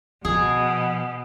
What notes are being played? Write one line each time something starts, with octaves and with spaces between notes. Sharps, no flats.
B2 F3 G#4